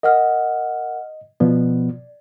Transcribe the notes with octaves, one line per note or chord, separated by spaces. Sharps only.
A#4 D#5 F#5 F6
B2 F3 B3 D5